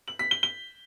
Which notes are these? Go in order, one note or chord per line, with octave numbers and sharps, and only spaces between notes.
F#7
B6
G7
G7